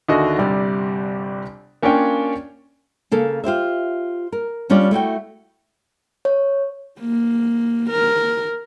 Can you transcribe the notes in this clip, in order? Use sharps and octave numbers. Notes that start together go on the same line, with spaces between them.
D#2 D3 F#4 D#5 E5
G1 C3 G3 D5
A#3 C#4 D4 F4 C#5 G5
C#3 A#3 A4
F4 G4 C5 E5
A#4
G3 C#4 D4 F4 G4 D5
A3 E4 F#4 G5
C#5
A#3
A#4